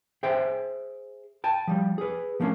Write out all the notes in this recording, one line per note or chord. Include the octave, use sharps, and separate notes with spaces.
G#4 C5 E5 G5
G5 A5
F3 G3
G#4 B4
F3 A3 A#3 C4 C#4